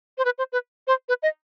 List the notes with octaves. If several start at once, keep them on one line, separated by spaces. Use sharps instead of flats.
C5
B4
C5
B4
C5
B4
D#5